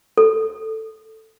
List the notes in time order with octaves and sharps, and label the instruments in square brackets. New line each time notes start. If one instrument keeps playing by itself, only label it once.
[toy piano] A4